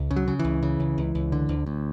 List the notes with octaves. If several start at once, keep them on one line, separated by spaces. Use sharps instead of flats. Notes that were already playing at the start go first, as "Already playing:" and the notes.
Already playing: C#2
C#3
F#3
C#3
E3
C#2
C#3
C#2
C#2
C#2
D3
D2
D2